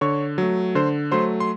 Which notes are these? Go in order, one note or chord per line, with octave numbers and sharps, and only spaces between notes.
D3 C#5 C#6
F#3 A3
D3 C5 C6
F#3 A3 C5 C6
C6